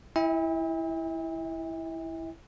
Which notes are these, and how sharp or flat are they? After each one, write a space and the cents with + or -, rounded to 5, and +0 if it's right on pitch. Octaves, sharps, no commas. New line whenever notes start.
E4 +0 E5 -40 G5 +45